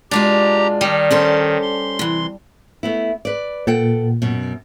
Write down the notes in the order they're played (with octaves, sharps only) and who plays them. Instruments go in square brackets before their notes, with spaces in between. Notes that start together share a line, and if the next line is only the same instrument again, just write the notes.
[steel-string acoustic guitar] B2 G#3 F4 [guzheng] D4 [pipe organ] G4 A#5
[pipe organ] D#3 [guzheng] G3
[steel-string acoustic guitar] C#4 A4 C5
[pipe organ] C6
[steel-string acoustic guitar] C3 E3
[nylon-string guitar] A3 B3 E4
B4 D5
[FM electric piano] A#2 [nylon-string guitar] A4 F#5 G5
[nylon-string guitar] F#2 B2